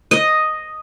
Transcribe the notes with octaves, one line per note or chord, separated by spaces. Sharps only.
D#5